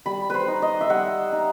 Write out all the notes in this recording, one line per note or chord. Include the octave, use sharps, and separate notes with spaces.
G3 B5
B4 C5
D#4
D#5
E5
G3 F#5
D#4